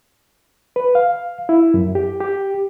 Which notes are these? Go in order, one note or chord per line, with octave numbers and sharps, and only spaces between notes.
B4
F5
E4
F#2
G4
G4